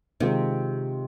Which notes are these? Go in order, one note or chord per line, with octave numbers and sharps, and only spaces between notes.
C3 D#3 G#3 C4 F4